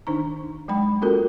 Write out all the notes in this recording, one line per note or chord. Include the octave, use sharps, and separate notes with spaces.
D#3 D4 D#4 A#5
F#3 G#3 G5 B5
A#3 C#4 F4 F#4 A4 A#4